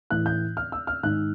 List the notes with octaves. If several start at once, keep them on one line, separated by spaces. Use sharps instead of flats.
A2 E3 F#6
G6
F6
E6
F6
G#2 D#3 F#6